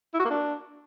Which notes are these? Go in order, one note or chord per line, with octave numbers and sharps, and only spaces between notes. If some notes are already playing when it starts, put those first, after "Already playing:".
E4
F#4
A#3
D4